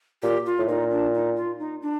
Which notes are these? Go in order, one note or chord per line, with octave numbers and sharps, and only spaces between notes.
A#2 G4
F4
A2
A#2 D#4
D4
D#4
F4
D#4
D4